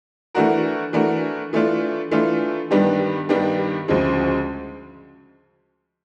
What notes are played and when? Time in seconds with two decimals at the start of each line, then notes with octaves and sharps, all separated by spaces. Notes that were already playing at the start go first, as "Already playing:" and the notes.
0.34 E3 A3 D4 F#4 A#4
0.93 E3 A3 D4 F#4 A#4
1.53 E3 A3 D4 F4
2.11 E3 A3 D4 F4
2.71 G2 D#3 G3 B3 D4
3.29 G2 D#3 G3 B3 D4
3.88 D2 C#3 F3 G#3